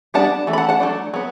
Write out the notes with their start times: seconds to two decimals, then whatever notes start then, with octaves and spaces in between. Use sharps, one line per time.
0.14 G3 B3 D4 F#5 A5
0.47 E3 A3
0.53 B5
0.58 F#5 A5
0.69 F#5 A5
0.80 F#3 A3 D4
1.14 F#3 B3